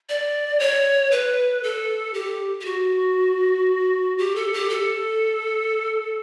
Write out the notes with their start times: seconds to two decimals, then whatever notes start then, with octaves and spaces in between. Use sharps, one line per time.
0.09 D5
0.60 C#5
1.11 B4
1.63 A4
2.14 G4
2.61 G4
2.65 F#4
4.18 G4
4.36 A4
4.53 G4
4.70 A4